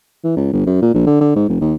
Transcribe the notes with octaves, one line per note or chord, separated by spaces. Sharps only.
E3
C#2
G1
F#2
A#2
A#1
D3
D3
G#2
F1
D#2